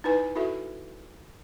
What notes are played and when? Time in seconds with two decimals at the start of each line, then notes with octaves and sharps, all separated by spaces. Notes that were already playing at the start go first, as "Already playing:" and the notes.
0.04 D#4 E4 B4 G#5
0.35 E4 F#4 A4 E5